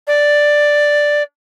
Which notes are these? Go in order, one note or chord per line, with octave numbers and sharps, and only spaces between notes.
D5